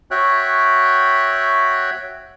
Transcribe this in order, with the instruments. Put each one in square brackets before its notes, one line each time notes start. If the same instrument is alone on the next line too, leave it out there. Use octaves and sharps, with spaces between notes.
[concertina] F#4 C#5 E5 G5 F#6